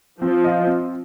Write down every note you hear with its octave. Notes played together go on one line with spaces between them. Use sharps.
F3 C4
F4 D#5
C4